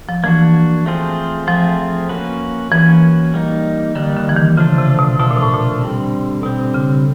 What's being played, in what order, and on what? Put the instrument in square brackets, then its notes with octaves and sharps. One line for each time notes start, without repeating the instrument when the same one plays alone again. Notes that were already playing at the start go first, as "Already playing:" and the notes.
[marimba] F3
[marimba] E3 [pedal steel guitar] A#3 D4 F#4
[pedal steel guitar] A3 C4 F4 G#4 C5
[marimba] F3 [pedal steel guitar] A3 C4 F4 G#4 C5
[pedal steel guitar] A#3 C#4 F#4 B4
[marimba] E3 [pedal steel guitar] A#3 C#4 F#4 B4
[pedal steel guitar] G3 A#3 D#4
[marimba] D3 [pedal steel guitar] G3 A#3 D#4
[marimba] D3
E3
D#3
[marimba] C#3 [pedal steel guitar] F3 A3 D4 F4 A4
[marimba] C3
B2
[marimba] B2 [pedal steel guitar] F3 A3 D4 F4 A4
[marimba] A#2
A2
A#2
[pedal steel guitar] D3 G3 C4
[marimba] B2 [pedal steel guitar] D3 G3 C4
[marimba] C#3